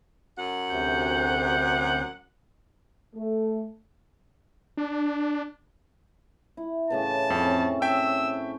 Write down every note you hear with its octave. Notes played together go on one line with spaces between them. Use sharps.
F#2 F#5
D2 C3 G6
A3
D4
E4
A2 C#3 E3 A5
F2 C4 C#4
E5 G5 A5 E6